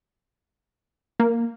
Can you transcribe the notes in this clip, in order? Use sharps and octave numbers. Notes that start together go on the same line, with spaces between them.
A#3